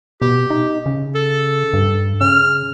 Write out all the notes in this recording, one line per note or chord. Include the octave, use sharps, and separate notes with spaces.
B2 G4
D#4
C#3
A4
G2
C#3 F6